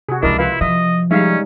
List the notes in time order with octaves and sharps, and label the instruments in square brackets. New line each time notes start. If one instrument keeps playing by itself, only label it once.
[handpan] C3 [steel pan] F#4 G#4
[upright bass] C#2 F3 [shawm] D4 [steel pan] E4 A#4 D#5
[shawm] E4 [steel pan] F4 B4 F5
[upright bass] F3 [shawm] D#5 [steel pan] E5
[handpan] G3 G#3 D#4 [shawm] C#4 [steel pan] E5 F5